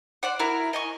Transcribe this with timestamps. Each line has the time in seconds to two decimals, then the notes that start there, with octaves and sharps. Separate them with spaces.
0.23 C5 D5 F#5
0.39 E4 F#4 A#4 E5
0.73 D#5 G#5 C#6